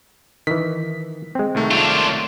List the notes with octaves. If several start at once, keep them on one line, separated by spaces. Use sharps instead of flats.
D#3 E3 B6
G#3 C4
C2 D#3 A3
D4 F4